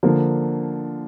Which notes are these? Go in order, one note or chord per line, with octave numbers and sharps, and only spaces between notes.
D3 F3 A#3